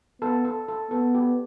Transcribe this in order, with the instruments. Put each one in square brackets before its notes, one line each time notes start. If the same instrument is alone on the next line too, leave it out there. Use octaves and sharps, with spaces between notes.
[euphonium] B3 [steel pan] A4
[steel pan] A4
A4
[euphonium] B3 [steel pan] A4
[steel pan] G4